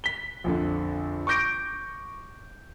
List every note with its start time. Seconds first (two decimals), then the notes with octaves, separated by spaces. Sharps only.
0.04 B6 G7
0.44 A#1 F2 D3
1.27 C#6 D6 G6 A#6 D7